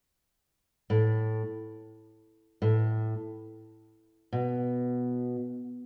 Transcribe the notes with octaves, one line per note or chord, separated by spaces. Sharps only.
A2
A2
B2